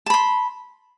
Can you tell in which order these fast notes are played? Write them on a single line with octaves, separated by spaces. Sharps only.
A5 B5 C6